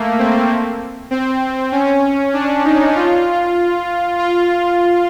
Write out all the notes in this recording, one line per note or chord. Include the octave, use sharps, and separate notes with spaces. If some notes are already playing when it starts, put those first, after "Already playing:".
Already playing: A3 A#3
C4
C4
C#4
D4
D#4
F4
F4